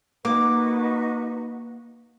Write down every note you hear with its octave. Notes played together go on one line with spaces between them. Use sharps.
A#3 D#4 F#4 B4 D6